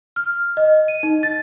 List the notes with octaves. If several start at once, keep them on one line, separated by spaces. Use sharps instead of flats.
F6
D#5
D#7
D#4
A6